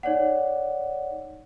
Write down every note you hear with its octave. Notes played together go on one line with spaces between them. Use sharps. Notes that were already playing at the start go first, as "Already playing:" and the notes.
D#4 C#5 D5 F#5